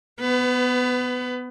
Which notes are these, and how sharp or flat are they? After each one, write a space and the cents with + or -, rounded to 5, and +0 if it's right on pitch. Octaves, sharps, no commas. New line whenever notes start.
B3 +10 B4 +30